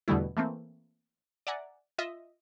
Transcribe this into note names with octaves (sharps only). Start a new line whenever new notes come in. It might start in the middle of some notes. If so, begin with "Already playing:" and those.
E2 B2 D3 G3 A3 E4
E3 A3 A#3 C4
D5 E5 F#5 G#5 A#5
F4 D#5 E5